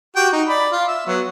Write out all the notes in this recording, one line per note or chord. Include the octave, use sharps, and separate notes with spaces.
F#4 G4 G5
D#4
D5 B5
F4
E5
F#3 B3